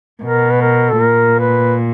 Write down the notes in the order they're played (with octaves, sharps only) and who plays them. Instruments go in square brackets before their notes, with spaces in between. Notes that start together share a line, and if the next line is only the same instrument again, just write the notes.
[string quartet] B2 [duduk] A#4
[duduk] B4
A#4
A4
[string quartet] A#2 [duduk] A#4
[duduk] B4